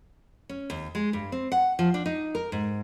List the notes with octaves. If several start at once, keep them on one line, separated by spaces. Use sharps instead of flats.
C#4
D#2
G#3
G2
C4
F#5
F3
D4
D#4
A#4
G#2